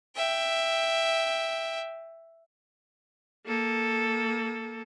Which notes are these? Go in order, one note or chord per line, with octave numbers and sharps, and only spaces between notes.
E5 G5
A#3 A4